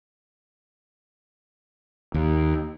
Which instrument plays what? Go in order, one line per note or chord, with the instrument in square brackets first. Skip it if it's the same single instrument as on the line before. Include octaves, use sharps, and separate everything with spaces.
[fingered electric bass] D#2